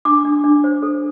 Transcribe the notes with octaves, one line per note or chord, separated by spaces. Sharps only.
D4 D6
D4
D4
C5
A4